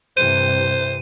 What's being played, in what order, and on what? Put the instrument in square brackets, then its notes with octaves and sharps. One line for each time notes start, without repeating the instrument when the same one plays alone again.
[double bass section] G2 C3 E3 [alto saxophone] C5 [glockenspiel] D#7